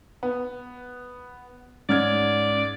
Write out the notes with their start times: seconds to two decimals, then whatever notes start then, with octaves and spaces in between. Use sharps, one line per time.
0.23 B3
1.89 G#2 C#4 D5 F6 G#6